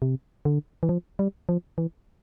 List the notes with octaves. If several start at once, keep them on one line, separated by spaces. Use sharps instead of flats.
C3
D3
E3
F3
G3
F3
E3